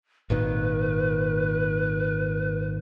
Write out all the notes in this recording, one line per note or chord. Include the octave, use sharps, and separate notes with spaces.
G#1 A#2 D#3 B4